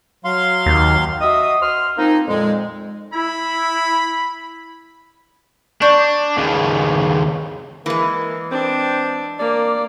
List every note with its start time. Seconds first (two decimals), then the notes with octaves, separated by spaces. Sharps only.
0.25 F#3 F5 C6
0.66 D#2
1.21 F#4 D#5 E5 D#6
1.61 C6 F6
1.97 F3 A#3 C4 D#4
2.27 F2 A#2 G#3
3.13 E4 B5
5.82 D4 D5 C#6 G6
6.37 D#2 C#3
7.86 E3 G#3 A#3
8.51 C4 D4
9.39 A#3 D5